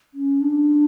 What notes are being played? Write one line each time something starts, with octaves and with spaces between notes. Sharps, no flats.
C#4
D4